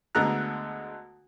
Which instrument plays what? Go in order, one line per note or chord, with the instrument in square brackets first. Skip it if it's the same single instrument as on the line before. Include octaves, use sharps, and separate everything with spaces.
[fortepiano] D2 D3 G#3 B3 A#5 F#6